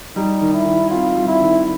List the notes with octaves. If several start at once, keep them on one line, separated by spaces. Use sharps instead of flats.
G3 D#4
D#3
E4
D#3
C4 F4
G3
E4
D#3